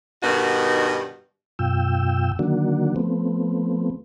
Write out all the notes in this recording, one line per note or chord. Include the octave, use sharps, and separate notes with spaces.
G2 B2 D#3 D#4 F#4
F#2 B2 F4 G5 E6
D3 D#3 F#3 A#3 D4 F#4
F3 A3 B3 C4